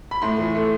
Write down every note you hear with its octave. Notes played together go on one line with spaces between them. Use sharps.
B5
A2 C6
E3
A3